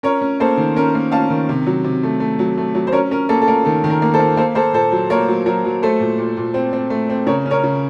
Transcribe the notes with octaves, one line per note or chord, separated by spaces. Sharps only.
C#4 A#4 C#5
C#4
A#3 A4 C5
D#3
C#4 A#4
A#3
C#4 F5 A5
D#3
C3
F#3
C3
A3
A3
F#3
A3
F#3
C5
C#4 A#4 C#5
C#4 A#4
A#3 A4
A4
A#3 A#4
D#3 A4
D#3
A#4
A#3
A4 C5
A#3
A#3 A4 C5
A#3 A4 C5
A#2 A4 C5
F#3
A#3 A#4 C#5
F#3
F#3 A#4
F#3
A3 A4 C5
A#2
A#2
A#2
C4
C4
A3
C4
C#3 A#4 C#5
C#4
A#4 C#5
C#3